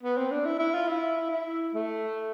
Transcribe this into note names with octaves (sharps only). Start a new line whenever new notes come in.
B3
C4
D4
E4
E4
F4
E4
E4
A3